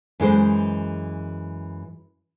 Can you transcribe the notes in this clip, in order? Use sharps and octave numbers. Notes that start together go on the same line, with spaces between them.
F#2 E3 G#3 C5